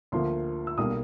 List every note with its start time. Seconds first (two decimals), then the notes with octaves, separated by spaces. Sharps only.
0.12 D2 D3 F3 A#3 C6
0.67 E6
0.78 B1 B2 G3 A#3 D#6